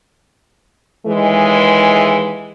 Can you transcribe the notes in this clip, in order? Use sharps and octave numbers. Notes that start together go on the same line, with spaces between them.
D#2 E3 G#3